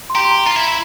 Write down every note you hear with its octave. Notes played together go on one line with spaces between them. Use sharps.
C6
G4 A#5
C6
A#5
F4 A#5
E4
E4